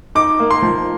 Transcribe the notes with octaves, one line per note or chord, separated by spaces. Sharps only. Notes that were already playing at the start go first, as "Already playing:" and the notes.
D#4 D6
A#3
C6
F3